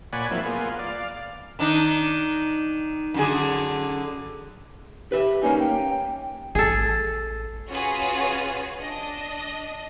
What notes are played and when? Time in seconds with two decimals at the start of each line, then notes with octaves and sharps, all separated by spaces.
0.13 A#2 C#5 D5 F#5 G#5 B5
0.31 F3 F#3 A#3 C4 E4
0.45 A#3 B3 F4 G#4
0.79 D5 F5
1.59 D#3 D4 D#4
3.14 F#2 D3 G#4
5.12 G4 B4 E5
5.43 A#3 C#4 D#4 G#5
5.60 G5
6.55 A1 G#4 A4
7.68 C#4 F4 F#4 G#4 B4
8.79 D4 D#5